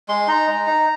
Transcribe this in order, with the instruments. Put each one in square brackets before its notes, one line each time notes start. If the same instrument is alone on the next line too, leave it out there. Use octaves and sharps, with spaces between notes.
[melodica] G#3 C6
D#4 A#5
G#3
D#4